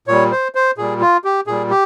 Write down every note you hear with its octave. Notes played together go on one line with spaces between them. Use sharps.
A#2 G3 C#5
C5
C5
A#2 G3 G#4
F4
G4
A#2 G3 G#4
G4